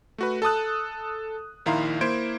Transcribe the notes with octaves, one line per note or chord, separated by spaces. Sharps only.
A3 F#4 B4
A4 A5 D#6 F#6
A#1 D#3 E4 F5 A#5 C6
A#3 E4 C5 G#6 D7